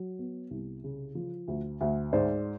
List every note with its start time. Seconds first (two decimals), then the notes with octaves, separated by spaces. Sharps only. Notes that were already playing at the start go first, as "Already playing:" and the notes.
Already playing: F#3
0.19 B3
0.51 C2
0.84 C#3
1.15 F3
1.48 D2
1.81 D2
2.13 G#2 C5 D5